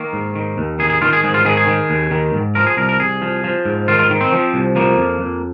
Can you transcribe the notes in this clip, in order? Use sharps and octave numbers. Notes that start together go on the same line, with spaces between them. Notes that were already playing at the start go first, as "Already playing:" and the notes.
Already playing: D#3 A#3
G#2
D#3
D#2
D#3 G#4
G#4
D#3 F4
G#4
G#2 G#4
F4
D#3 G#4
G#4
D#3
D#2
D#3
G#2
F3 A#4
G#4
C2 A#4
A#4
C2 G#4
F3
F3
G#2
D#3 F4
F4
D#3
C4
F3
C2
F3 A#3
F2
F2